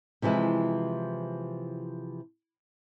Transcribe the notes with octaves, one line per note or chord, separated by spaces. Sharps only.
C3 E3 F3 G#3 E4